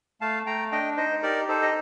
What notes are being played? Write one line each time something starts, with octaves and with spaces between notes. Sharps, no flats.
A3 F5 A5
A3 G5 A#5
D4 D#5 G5
D#4 C5 D#5
G4 A#4 D5
D#4 A4 C5
D#5